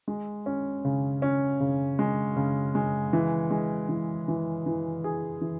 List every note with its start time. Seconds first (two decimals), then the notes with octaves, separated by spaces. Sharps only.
0.08 G#3
0.46 C#4
0.85 C#3
1.22 C#4
1.60 C#3
1.99 G#3
2.37 C#3
2.75 G#3
3.13 E3
3.51 G#3
3.89 E3
4.28 E3
4.66 E3
5.04 G#4
5.41 E3